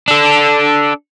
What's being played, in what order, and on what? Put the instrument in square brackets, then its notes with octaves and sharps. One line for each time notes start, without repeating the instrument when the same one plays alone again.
[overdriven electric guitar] D4 A4